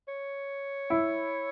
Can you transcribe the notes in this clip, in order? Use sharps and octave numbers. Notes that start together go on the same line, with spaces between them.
C#5
E4